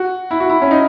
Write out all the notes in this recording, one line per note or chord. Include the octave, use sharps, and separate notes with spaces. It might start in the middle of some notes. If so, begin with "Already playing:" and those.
Already playing: F#4
E4
F#4
E4
C#4
D#4